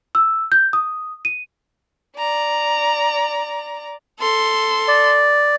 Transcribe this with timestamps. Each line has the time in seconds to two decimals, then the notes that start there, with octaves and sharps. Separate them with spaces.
0.15 E6
0.52 G6
0.73 D#6
1.25 D#7
2.18 D5 A#5
4.20 A4 C6
4.88 D5